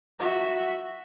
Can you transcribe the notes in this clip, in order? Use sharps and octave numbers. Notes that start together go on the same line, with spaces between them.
F#4 E5